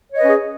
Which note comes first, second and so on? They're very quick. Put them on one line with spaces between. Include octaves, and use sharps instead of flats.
C#5 D#5 B4 C#4 G#4